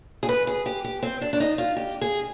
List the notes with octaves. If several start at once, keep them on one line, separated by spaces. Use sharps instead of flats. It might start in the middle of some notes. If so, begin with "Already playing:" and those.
G#4
B4
G#4
G4
G4
C4
D4
D4
D#4
F4
G4
G#4